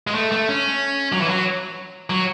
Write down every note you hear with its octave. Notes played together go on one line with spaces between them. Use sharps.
G#3
A3
A3
C#4
F#3
E3
F#3
F#3